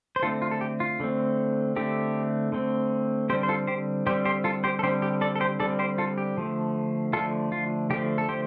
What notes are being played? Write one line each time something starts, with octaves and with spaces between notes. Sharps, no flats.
C5
D3 A3 C4 F4 A4
F4
A4
G4
F4
D3 A3 C4
D3 A3 C4 G4
D3 A3 C4
D3 G3 C4 G4 C5
C5
F4 A4
G4 C5
D3 G3 C4 G4 C5
G4 C5
F4 A4
G4 C5
A4
D3 G3 C4 G4 C5
G4
A4 D5
A4
G4 C5
D3 G3 C4 A4 D5
G4 C5
F4 A4
G4
D3 F3 A3
D3 F3 A3 F4 A4
F4
D3 F3 A3 G4
A4
G4 C5